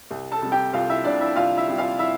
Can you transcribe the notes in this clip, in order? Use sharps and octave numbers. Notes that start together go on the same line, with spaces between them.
C2
A4 A5
C3 G3
G4 G5
C2 F4 F5
E4 E5
C3 G3 D4 D5
E4 E5
C2 F4 F5
E4 E5
C3 G3
F4 F5
E4 E5